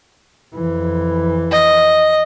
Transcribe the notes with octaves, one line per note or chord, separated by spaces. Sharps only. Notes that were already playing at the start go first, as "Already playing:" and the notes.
F2 E3
D#5